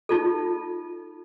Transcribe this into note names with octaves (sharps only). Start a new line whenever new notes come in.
D#4 F4 A4